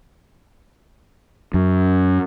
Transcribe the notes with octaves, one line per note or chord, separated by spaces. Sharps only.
F#2